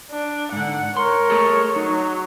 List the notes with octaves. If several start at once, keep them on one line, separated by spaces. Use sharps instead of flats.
D4
G#2 D3 F#5
A#4 C#5 C6
A3 G#4 A4
F#3 D#4 C#5